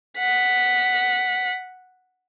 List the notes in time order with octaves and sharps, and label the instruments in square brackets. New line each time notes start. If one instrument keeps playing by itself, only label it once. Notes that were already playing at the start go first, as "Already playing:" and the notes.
[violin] F#5 B6